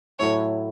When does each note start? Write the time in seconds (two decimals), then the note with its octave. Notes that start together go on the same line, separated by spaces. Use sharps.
0.19 A2 F#3 A3 E4 C#5